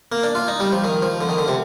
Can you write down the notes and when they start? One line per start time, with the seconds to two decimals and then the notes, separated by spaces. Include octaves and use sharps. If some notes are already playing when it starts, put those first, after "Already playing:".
0.12 A#3
0.23 D4
0.35 F4
0.48 D#4
0.60 G3
0.72 F3
0.84 D#3
1.02 F3
1.21 D3
1.29 D#3
1.38 D3
1.48 C3